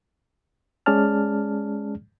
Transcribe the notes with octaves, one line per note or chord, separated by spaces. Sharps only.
G#3 C#4 G#4 D5 A5 F6